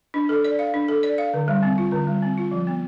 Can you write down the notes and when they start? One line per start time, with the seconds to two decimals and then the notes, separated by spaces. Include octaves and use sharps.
0.14 D4
0.29 A4
0.44 D5
0.59 F5
0.74 D4
0.88 A4
1.03 D5
1.18 F5
1.34 D3
1.48 G3
1.63 C4
1.78 F4
1.92 D3
2.07 G3
2.23 C4
2.37 F4
2.51 F3
2.67 B3